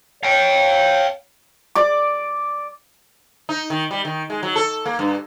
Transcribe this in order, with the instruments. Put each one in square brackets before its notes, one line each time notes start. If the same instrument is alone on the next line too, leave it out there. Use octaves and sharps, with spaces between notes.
[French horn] C#5 [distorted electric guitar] F5 G5
[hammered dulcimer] D5 D6
[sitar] D#4
D#3
G3
D#3
G#3
F#3
A4
A#3
G2